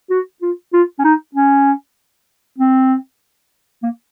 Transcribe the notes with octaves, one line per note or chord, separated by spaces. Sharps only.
F#4
F4
F4
C#4
D#4
C#4
C4
A#3